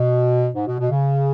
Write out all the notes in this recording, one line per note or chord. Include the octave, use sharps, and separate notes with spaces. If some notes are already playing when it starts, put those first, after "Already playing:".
Already playing: B2
G#2
B2
B2
C#3